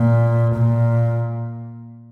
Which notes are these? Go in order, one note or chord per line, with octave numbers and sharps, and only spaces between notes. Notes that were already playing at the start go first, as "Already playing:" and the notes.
Already playing: A#2
A#2